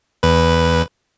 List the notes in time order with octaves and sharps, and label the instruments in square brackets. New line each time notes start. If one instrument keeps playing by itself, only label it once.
[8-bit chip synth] E2 B4